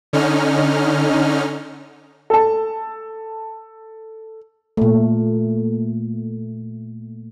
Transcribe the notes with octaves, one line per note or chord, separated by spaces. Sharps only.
D3 C#4 D#4 F6
A4 A5
A#2 A3